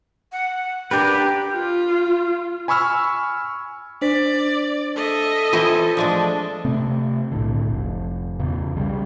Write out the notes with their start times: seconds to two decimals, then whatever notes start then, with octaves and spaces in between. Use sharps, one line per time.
0.32 F#5
0.91 D4 G4 A#4 B4
1.53 F4
2.68 G#5 B5 C#6 E6 F6
4.02 D4 C5 D5 B6
4.96 A4 D#5 E5
5.53 E3 C4 E4 F4 G7
5.97 F3 G#3 A3 D4
6.65 C3 A3 C4
7.32 B1 A2 D3
7.69 F1
8.40 E2 C#3
8.75 B1 C#3 F3 G3